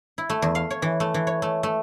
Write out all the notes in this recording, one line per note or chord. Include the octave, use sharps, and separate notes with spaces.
E4
A3
E2
F5
C#5
E3
A3
E3
C#5
A3
A3